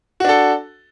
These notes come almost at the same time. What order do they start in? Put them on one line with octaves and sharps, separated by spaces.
F#4 D4 A4